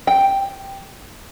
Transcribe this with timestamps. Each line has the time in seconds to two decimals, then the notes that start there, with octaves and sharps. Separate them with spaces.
0.07 G5